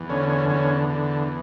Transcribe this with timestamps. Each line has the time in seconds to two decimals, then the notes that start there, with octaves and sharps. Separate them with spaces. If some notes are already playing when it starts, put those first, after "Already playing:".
Already playing: E2
0.10 D3 C#4
0.30 C#4
0.49 E2 C#4
0.89 D3